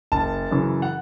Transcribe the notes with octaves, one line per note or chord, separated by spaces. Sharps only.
F#1 A5
F#2 C#3 E3
F#5